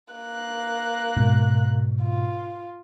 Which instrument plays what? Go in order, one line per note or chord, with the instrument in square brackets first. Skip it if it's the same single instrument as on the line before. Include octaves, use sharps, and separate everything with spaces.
[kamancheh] A#3 F#6
[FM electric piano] G#2 B2
[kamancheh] F4